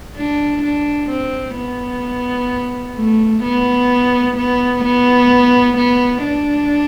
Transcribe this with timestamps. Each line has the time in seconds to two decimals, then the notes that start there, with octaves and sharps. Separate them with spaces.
0.16 D4
0.62 D4
1.10 C4
1.56 B3
2.96 A3
3.43 B3
4.37 B3
4.84 B3
5.77 B3
6.24 D4